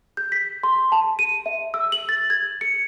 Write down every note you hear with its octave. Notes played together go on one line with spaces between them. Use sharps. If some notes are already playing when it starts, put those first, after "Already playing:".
G6
B6
C6
A5
D#7
E5
E6
F#7
A6
G#6
C#7